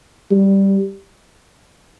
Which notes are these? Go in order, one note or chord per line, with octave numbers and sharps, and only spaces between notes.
G3